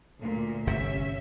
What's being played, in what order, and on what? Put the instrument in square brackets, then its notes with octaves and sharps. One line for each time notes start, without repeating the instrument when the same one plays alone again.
[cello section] D2 A#2
[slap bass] G1 C3 [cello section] C#4 E5